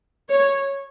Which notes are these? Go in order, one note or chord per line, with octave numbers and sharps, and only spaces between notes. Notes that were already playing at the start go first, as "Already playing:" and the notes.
C#5